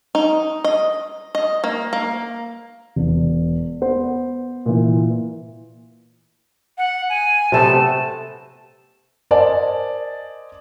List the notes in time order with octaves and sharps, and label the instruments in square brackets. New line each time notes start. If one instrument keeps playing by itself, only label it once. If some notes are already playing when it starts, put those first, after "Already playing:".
[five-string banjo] D#4
D#5
D#5
A#3
A#3
[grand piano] E1
B3 C5
A#2 E3
[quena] F#5
G#5
[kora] C3 A3 B3 [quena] A5
[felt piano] A#4 C5 D5 D#5 G#5 A5